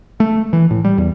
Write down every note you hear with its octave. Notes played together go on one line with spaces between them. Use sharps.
A3
E3
A2
G3
E2